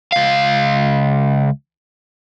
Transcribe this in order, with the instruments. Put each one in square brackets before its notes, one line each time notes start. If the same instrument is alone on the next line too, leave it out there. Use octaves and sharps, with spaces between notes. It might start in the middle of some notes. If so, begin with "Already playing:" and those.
[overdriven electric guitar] C#2 F5